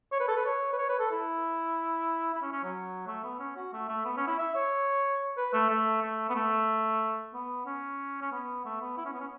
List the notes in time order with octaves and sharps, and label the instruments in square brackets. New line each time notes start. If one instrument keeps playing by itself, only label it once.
[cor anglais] C#5
B4
A4
B4
C#5
B4
C#5
B4
A4
E4
E4
C#4
C#4
F#3
A3
B3
C#4
F#4
A3
A3
B3
C#4
E4
E5
C#5
B4
A3
A3
A3
B3
A3
B3
C#4
C#4
B3
A3
B3
E4
C#4
B3
C#4